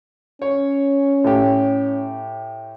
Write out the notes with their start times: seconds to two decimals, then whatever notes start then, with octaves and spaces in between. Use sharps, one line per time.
0.42 C#4 C#5
1.24 A2 G4